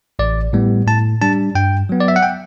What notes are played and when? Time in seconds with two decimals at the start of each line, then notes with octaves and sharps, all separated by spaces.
0.19 A1 D5
0.53 A2 G3 B3
0.87 A2 A5
1.21 G3 D4 A5
1.55 G2 G5
1.89 F#3 B3
2.00 D5
2.08 E5
2.16 F#5
2.23 G5